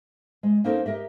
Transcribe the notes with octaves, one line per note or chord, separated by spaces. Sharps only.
G#3
A#3 C4 C#4 D#4 A4 A#4
G4 A#4 D#5 E5